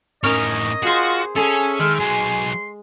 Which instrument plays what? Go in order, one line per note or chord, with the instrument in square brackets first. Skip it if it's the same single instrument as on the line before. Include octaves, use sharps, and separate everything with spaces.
[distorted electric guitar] A2 D#4 [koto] C#4 A#4 C#5 [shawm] D#5
[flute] F4 [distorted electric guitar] F#4 [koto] G#4 C5
[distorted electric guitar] C#4 [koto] G#4 A4 [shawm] E5 [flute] G#5
[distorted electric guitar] D#3 [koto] G#3 [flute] F6
[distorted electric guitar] F#3 D#4 [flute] G#5 [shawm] C6